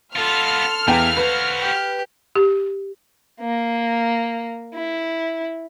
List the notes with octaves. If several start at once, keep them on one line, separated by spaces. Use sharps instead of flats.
B3 F4 A4 C6 F6
E2 E3 F5 G5
F#4 B4 C5
G4
G4
A#3
E4